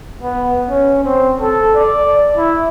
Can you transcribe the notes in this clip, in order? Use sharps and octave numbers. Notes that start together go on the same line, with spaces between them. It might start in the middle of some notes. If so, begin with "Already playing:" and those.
B3
C#4
C4
A4
D5
E4